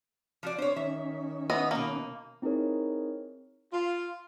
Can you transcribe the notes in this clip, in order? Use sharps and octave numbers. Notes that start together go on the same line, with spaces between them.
F3 F#4 D5
C4 D4 C5 C#5
D#3 C#4 E5
E3 B3 D#5
B2 A#3 D#4
C4 D#4 E4 G#4 A#4 C#5
F4